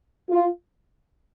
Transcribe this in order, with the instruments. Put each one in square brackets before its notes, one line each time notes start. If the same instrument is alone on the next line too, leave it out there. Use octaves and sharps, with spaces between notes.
[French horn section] F4